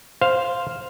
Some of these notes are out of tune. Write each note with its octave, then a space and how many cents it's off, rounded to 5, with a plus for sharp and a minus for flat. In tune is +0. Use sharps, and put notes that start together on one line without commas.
C5 +0 F5 +0